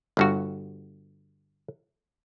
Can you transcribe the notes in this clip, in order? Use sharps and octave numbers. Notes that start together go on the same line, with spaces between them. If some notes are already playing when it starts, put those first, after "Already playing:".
G1 G2 F#4